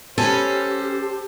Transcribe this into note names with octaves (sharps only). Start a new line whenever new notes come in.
C#4 G4 A4 B4 C5